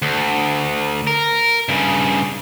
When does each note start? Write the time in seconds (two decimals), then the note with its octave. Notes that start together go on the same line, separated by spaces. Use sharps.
0.02 D2
1.07 A#4
1.69 G2 C#3